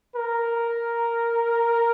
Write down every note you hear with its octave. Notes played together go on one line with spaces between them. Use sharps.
A#4